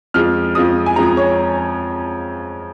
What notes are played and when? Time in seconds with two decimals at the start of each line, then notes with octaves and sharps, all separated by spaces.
0.14 F2 F3 G#3 F6
0.55 F2 F3 G#3 D#6
0.86 G#5
0.96 F2 F3 G#3 A#5
1.17 C#5